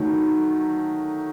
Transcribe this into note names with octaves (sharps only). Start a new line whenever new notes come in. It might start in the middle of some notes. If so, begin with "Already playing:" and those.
Already playing: D#3 F#3 A3